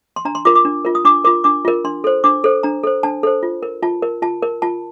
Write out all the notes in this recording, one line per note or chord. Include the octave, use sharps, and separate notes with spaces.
C6
D4 A#5
C6
F4 A#4 D6
D6
D4
F4 A#4
D#6
D4 D6
F4 A#4 D6
D4 D6
F4 A#4
D4 C6
A4 C5
D4 D6
A4 C5
D4 A#5
A4 C5
D4 A5
A4 C5
F4
A#4
F4 A5
A#4
F4 A5
A#4
F4 A5